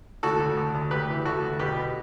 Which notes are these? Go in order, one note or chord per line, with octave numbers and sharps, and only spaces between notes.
D2 F#4 A4
D2
D2
D2
D2 G4 B4
E3
D2 F#4 A4
D2
B2 G4 B4
B2